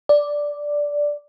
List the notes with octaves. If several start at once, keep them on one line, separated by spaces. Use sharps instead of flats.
D5